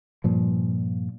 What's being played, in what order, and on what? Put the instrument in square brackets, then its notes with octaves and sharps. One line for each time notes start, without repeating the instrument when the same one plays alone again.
[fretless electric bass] G2 A#2 F3